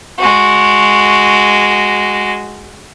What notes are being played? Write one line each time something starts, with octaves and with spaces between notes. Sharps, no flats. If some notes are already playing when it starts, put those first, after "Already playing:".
G#3 F#4